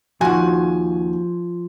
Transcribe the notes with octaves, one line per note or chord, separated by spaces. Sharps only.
D#2 F3 F#4 G#5